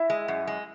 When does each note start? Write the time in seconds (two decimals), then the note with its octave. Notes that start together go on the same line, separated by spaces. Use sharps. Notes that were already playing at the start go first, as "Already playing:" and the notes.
Already playing: E4 E5
0.10 G#3
0.28 F#2
0.47 G#3